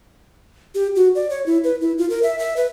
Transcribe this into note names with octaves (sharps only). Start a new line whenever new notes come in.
G4
F#4
D5
C#5
E4
B4
E4
F4
A#4
E5
E5
B4